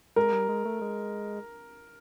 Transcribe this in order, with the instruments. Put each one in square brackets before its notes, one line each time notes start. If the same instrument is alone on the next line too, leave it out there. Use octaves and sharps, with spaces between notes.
[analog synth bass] G#3 [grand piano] A#4
[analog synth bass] G3
G#3
A3
G#3